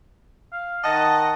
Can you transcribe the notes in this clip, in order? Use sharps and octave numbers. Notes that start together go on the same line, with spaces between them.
F5
D#3 D#5 F#5 A5